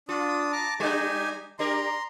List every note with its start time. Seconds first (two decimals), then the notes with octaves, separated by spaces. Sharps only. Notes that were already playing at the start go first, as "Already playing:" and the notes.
0.09 D4 F4 D#6
0.52 A5 A#5 D6
0.80 G3 D4 D#4 G4 G#5
1.59 D4 G4 A#4 A#5 C6